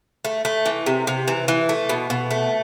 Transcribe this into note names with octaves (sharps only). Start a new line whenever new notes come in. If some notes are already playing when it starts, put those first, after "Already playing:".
A3
A3
E3
C3
C3
E3
E3
A3
B2
B2
A3